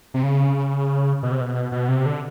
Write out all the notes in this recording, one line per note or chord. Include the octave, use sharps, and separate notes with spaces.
C3
C#3
B2
C3
B2
B2
C3
D3